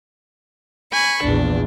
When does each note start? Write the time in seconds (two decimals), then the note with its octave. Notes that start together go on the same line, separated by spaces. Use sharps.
0.93 G#5 B5 C#6
1.23 A#1 E2 D4